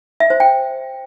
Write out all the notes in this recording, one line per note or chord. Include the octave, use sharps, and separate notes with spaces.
E5
C5
G5